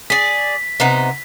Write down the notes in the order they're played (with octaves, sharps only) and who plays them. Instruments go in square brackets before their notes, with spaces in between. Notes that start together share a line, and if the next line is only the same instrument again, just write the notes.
[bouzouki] G#4 D5 [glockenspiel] B6
[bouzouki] C3 B3 D#4